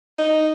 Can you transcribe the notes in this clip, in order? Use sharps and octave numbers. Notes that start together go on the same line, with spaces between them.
D#4